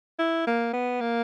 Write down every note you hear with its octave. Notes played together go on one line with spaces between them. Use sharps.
E4
A#3
B3
A#3